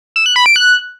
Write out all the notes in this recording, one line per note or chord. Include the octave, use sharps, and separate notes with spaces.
E6
F#6
B5
D7
F#6